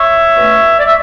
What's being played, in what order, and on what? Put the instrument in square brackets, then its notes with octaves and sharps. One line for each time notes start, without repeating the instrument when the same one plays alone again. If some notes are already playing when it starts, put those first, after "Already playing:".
Already playing: [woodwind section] C#5 E5
B2 A3 C#4
D5
E5